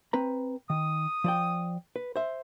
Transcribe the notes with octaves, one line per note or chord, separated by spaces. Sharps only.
C4 B4 A#5
D#3 D#6
F3 D5 G5
B4
C5 E5